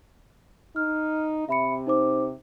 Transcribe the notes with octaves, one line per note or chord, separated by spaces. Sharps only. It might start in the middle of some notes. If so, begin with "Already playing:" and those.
D#4 F6
C3 E5 B5 C#7
D#4 C5 D6